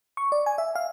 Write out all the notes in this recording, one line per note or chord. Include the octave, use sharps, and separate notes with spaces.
C#6
D5
G#5
E5
F5